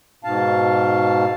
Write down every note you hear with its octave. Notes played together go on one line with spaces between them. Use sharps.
G#2 B2 F5 A5